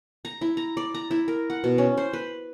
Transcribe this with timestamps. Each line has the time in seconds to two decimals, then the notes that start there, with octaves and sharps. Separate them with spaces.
0.25 A#5
0.41 E4
0.57 A#5
0.77 D5
0.94 A#5
1.11 E4
1.28 A#4
1.50 F#5
1.64 B2
1.78 C#4
1.97 C5
2.13 B4